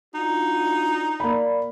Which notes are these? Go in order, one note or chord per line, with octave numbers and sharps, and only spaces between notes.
D4 D#4 F4 F#4
A#3 D5 B5